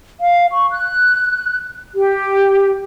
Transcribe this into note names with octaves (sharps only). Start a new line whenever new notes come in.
F5
C#6
F#6
G4